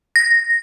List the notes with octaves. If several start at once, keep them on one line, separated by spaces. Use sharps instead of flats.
A#6